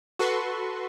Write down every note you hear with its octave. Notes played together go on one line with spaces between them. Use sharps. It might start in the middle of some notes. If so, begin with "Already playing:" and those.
F#4 A4 B4 C6 C#6